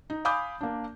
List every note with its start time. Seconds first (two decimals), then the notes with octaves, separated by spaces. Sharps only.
0.10 D#4
0.25 F5 G#5 B5 D6 D#6 G6
0.61 A#3 D4